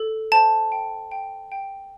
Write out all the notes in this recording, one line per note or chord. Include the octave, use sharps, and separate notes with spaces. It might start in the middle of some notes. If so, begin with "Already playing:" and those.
Already playing: A4
C5 A5
G5
G5
G5